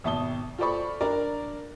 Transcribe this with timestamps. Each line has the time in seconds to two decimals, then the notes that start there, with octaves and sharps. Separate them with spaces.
0.04 G#1 B2 E5 A5 D#6 G7
0.58 F4 A4 C5 D5 B5 C#6
1.01 D4 A#4 D5